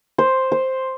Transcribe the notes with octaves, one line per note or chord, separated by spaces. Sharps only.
C5
C5